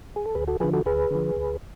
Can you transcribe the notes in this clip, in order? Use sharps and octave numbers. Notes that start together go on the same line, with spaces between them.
G#4
A4
D2 G#4 B4
F#4 A4
D3 F3 G#4 B4
F#4 A4
D2 G#4 B4
D3 F3
D2